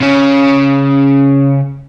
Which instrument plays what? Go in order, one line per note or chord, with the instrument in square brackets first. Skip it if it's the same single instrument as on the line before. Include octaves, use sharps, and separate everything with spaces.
[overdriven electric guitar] C#3 C#4